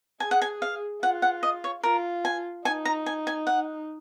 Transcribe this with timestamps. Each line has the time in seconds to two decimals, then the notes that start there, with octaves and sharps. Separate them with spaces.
0.20 G#4 G#5
0.31 F#5
0.42 G#5
0.62 F5
1.02 F4 F#5
1.22 F#5
1.43 D#5
1.64 C#5
1.83 F4 A#4
2.25 G#5
2.65 D#4 G#5
2.85 A#5
3.06 G#5
3.27 G#5
3.47 F#5